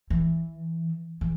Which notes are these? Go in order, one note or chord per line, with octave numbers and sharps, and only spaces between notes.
E3
E3